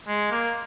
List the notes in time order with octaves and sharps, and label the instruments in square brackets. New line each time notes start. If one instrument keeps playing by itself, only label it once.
[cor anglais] G#3
A#3